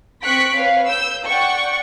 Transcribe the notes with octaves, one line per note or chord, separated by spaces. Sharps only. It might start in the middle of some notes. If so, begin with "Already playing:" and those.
C4 C#6 F#6 B6 D7
B4 C#5 F5
E6 G6
D5 F#5 G5 C#6